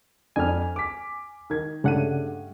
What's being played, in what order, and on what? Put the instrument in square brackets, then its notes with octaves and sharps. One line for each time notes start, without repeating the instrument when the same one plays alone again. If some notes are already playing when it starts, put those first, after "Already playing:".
[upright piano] F2 C4 D4 [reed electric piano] G#5 F6
[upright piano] D6 B6
D#3 G#6
[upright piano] G2 A3 D#7 [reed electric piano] C#3 D4 F#5